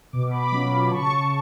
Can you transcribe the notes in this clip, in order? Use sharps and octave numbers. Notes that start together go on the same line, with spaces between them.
B2 D6
B5 D6
F#3 C#4 F4
C#3 A5 C#6